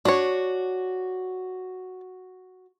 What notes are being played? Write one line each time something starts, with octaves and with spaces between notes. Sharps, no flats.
D4 F#4 C#5